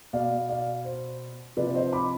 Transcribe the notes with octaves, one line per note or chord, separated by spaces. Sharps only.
B2 D5 F5
D5 F5
C5
C3 F3 B4 D5
C5 D#5
B5 D6